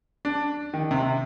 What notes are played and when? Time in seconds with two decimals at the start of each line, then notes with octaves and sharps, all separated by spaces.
0.25 D4
0.74 D#3
0.91 C3
1.02 C3